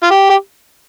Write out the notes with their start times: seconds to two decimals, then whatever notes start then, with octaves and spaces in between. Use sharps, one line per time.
0.03 F4
0.11 G4
0.29 G4